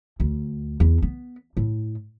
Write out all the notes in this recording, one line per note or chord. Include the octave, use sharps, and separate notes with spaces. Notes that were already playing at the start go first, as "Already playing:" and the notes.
D2
E2
B3
A2